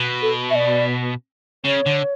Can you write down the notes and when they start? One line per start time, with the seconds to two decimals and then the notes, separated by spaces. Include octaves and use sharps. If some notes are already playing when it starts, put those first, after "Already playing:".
Already playing: B2
0.22 A4
0.50 E5
0.55 D5
1.64 C#3 C#5
1.86 D3